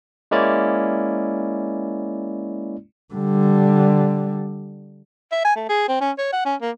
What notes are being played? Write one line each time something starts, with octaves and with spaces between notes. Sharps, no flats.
G#3 A#3 C#4 E4 D5
D3 G3
E5
G#5
A3
G#4
C4
C#4
C#5
F#5
C#4
A#3